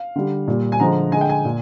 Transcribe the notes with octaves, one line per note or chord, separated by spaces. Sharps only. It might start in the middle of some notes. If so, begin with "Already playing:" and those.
Already playing: F5
D3 G3
A#2 G3
G#5
D3 F3 G#3 A#5
D3 G#3 G#5
G5
G#5
A#2